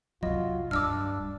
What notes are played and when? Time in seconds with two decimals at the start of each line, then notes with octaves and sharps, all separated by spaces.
0.23 C2 F2 F#3 F4 D#5
0.71 D1 G2 D4 D6 E6 F6